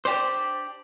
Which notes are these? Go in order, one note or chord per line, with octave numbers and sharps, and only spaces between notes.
D4 G4 C5 D5